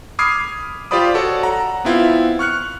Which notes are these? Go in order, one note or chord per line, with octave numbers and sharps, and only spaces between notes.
B5 D6 D#6 F6 G#6 C7
F4 G4 C5 D5 B5 D#6
F#4 A4 C#5 D5
F#5 A#5
B3 C4 E4 F4
C#6 F6 F#6 C#7